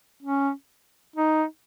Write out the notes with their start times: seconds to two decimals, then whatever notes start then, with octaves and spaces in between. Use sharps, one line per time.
0.23 C#4
1.16 D#4